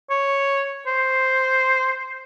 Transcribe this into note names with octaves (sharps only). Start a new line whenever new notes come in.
C#5
C5